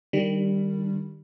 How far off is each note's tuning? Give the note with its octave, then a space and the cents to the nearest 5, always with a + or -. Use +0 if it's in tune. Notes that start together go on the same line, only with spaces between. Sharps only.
D#3 -25 G3 +0 D4 +0